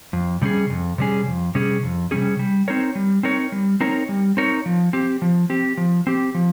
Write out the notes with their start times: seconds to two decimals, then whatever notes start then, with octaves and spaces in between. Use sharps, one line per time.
0.13 F2
0.41 C3 G3 C#4 G#4
0.70 F2
0.98 C3 G3 C#4 G#4
1.26 F2
1.55 C3 G3 C#4 G#4
1.83 F2
2.11 C3 G3 C#4 G#4
2.39 G3
2.68 C4 D#4 A#4 C#5
2.95 G3
3.23 C4 D#4 A#4 C#5
3.52 G3
3.81 C4 D#4 A#4 C#5
4.09 G3
4.37 C4 D#4 A#4 C#5
4.66 F3
4.93 C4 G4
5.22 F3
5.50 C4 G4
5.77 F3
6.07 C4 G4
6.35 F3